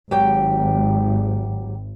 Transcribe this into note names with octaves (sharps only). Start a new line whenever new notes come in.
G#1 F#3 G4 G5